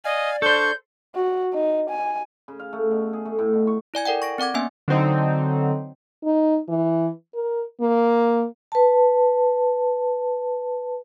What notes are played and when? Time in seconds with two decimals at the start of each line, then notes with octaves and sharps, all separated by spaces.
0.05 D5 D#5 F5 G#5
0.42 D4 A4 C5 C#6 G6
1.15 F#4
1.53 D#4
1.90 G#5
2.48 C#3
2.59 F5
2.73 A3
2.91 B2
3.13 G#4
3.25 A3
3.39 A2
3.53 B2
3.67 C#6
3.94 E4 D5 G#5 G#6
4.05 A4 A#4 D5 F#5 G5
4.22 C#6 A#6 D7
4.38 C4 D5 F#5 D6 G#6
4.54 A#3 B3 C#4 E5 G#5
4.88 D3 F#3 C4 D#4
6.24 D#4
6.68 E3
7.34 A#4
7.81 A#3
8.72 B4 A5